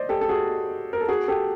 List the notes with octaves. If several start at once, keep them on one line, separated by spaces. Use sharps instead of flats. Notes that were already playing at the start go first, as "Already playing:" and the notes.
Already playing: C5 D5 D#5
G4 A4
A4
F#4 G#4
A#4
A4
F#4 G#4
G4 A4